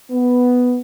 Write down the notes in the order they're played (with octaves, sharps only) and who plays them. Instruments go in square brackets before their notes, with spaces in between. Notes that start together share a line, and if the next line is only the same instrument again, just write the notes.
[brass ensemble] B3